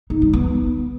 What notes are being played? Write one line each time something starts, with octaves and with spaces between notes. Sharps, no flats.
D#4
G3
B3